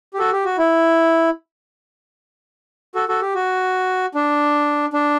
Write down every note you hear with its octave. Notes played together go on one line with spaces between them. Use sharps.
G4
F#4 A4
G4
F#4
E4
F#4 A4
F#4 A4
G4
F#4
D4
D4